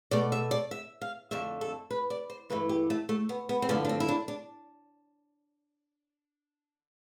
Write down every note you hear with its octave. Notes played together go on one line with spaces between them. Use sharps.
B2 A3 D5
E5
D5
E5
F5
F2 D3 A3 E5
A4
B4
D5
C5
G2 E3 A3 B4
G4
A3
A3
B3
B3
C4
G2 D3 F3 A3 B3
D4
C4
E4
D4
D4